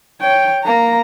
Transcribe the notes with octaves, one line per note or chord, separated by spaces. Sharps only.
C#5 G5
A#3 A#5